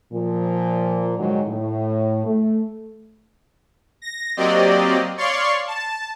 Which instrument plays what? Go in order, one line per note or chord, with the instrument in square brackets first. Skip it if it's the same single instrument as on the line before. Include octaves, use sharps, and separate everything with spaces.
[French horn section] A#2 F3
G#2 D3 D#3 F#3 G#3
A2
A3
[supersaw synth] A#6
F#3 A#3 C4 G4 D5 D#5
C#5 D5 F5 C6 C#6
A5